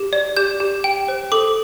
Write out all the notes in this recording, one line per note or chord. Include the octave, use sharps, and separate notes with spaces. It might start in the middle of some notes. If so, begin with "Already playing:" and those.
Already playing: G4
D5
G4 G6
G4
G5
C5
A4 D6